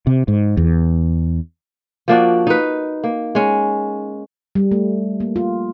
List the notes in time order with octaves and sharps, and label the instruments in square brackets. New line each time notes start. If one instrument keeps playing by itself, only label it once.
[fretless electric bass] C3
G#2
E2
[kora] F3 A#3 D4 F#4
D#4 B4
A#3
G#3 C#4
[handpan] G3
A3
A#3
F4